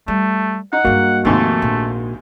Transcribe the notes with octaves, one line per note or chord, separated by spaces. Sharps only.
G3 A3
D#4 F#5
G2 G#3 A#3 F#4
D#2 G#2 C3 F3 A3 B3
A#1